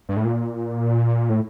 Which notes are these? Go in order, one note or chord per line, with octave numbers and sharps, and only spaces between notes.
G2
A2
A#2
A2